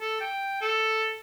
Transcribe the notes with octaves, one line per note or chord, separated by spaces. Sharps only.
A4
G5
A4